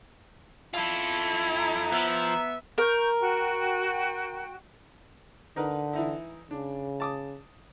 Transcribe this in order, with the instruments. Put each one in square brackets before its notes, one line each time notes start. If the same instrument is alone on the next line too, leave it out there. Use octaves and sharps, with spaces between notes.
[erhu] E4 [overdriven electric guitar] F4 A4
[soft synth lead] A#5
[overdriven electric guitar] F3 [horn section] B3 E5
[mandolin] A#4 [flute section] C#6 G6
[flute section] F#4 G5
[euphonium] D3 [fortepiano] D#4 A#4 B4
[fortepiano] E3 D#4 E4
[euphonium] C#3 [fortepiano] D4
[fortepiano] A5 D6 D#6